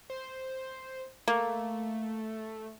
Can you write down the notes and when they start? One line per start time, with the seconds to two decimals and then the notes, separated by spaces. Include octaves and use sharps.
0.10 C5
1.28 A3 A#3